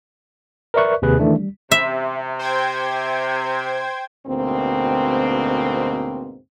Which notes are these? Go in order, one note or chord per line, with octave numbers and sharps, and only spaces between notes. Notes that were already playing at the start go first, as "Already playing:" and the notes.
A#4 B4 D5 E5 C#6 F#6
D#2 C3 G#4 B4 F#6
D#3 E3 A3 D4
G3
C3 E5
C5 G5 G#6
D2 G#2 B2 A#3 C4